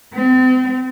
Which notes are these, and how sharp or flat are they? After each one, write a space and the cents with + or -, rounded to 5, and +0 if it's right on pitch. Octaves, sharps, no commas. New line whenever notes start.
C4 -40